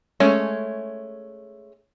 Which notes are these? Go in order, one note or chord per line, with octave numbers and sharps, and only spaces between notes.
G#3 A3 C#4